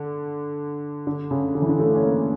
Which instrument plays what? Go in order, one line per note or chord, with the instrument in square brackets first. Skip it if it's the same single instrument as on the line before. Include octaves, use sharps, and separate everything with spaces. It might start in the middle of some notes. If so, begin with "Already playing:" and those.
Already playing: [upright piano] D3
D3
C#3
D3
E3
D3
A3
C#4
A#3